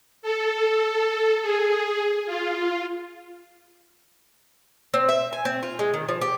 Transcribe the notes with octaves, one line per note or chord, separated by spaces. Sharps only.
A4
G#4
F4
C4
E5
G#5
C4
F4
G#3
D#3
F3
G4